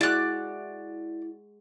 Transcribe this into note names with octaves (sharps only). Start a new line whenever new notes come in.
G#3 E4 F#4 D5 F#6